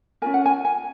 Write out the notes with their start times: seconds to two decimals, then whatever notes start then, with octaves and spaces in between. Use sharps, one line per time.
0.22 C#4 F4 A#4 G#5
0.34 F#5
0.46 G#5
0.65 G#5